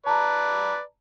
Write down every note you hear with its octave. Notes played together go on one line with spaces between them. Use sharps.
B4 D5 A5 A#5